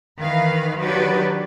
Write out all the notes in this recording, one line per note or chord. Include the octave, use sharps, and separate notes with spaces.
D#3 E3 B4 F5
D#3 F#3 D4 G4 B4 D5